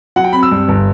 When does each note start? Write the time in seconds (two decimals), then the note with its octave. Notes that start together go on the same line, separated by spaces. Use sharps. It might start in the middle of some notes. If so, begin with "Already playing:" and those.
0.16 F#3 F#5
0.24 G5
0.33 C4 B5
0.43 E6
0.51 G2
0.68 G1